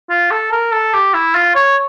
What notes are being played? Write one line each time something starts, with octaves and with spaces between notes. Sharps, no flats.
F4
A4
A#4
A4
G4
E4
F4
C#5